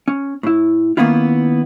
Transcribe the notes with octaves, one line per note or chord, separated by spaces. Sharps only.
C#4
A2 E4
D#3 A#3 B3 C#4 E4 F4